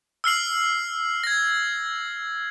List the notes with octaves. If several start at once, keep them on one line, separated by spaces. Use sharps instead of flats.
E6 F6 C7 F#7
G#6 A#6